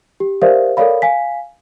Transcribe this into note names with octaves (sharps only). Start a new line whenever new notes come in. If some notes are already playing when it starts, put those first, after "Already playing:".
G4
G4 A#4 C5 D5 E5 F5
A4 A#4 C#5 D5 F5 B5
F5 G#5 B6